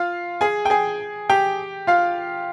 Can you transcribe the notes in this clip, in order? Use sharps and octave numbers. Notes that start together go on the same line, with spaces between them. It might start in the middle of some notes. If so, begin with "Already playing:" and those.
Already playing: F4 F5
G#4 G#5
G5
G#4 G#5
G4 G5
F4 F5